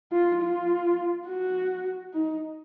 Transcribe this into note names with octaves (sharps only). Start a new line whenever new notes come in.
F4
F4
F#4
D#4